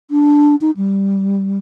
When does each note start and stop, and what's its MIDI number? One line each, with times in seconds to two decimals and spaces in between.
0.11 0.56 62
0.61 0.71 63
0.77 1.58 55